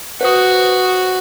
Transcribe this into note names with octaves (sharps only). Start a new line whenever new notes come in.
F#4 B4 C5 D#6